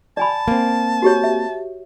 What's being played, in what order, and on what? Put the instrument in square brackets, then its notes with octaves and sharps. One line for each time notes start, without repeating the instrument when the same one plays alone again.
[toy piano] D5 G#5 B5 [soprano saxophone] A5
[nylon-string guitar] A#3 C4
[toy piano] F#4 G4 C#5
E5